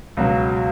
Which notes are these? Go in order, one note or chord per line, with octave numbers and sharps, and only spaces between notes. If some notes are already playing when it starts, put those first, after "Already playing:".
C#2 B2 F#3